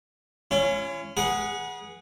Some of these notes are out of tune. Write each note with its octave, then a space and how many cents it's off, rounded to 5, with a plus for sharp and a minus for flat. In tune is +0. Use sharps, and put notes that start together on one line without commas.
C#4 +0 E4 +45
G#4 -5 B4 -40 F#5 +0